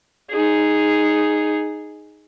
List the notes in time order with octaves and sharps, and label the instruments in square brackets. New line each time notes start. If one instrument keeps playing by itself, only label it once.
[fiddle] D#4 G#4